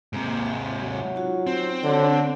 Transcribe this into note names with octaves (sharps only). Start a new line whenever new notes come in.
G#2 C3 A#3 C5
E5
F#3
D#4 F4 F#4
C4
D3 F#4 C#5